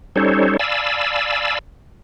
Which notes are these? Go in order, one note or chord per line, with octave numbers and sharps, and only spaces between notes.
G3 C#4 D#4 A4 C5 C#5
D5 F5 G#5 A5 B5 E6